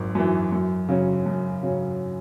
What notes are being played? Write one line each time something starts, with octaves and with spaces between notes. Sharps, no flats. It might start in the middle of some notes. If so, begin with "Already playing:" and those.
Already playing: G#1 F#2
F#2 E3
F#2
C#3 F#3 C#4
F#2
C#3 F#3 C#4